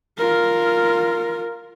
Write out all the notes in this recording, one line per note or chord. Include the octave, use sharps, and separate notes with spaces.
F4 A#4